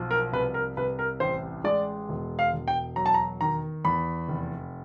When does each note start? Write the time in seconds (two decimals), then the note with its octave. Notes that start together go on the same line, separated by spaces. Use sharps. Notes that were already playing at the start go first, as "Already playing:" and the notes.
Already playing: B1 F3
0.11 A#4
0.33 C2 B4
0.54 A#4
0.77 C2 B4
0.99 A#4
1.20 A1 C5
1.64 G#3 D5
2.09 E1
2.39 F5
2.53 E1
2.68 G5
2.96 F#3 A#5
3.06 A5
3.14 A#5
3.41 D#3 A#5
3.84 E2 B5
4.28 F1